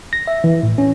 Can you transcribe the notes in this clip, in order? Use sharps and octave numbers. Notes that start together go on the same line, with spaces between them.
A#6
E5
E3
A2
C#4